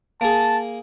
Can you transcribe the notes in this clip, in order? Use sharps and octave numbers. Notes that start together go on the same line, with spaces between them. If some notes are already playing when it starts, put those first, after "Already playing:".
A#3 G#4 A5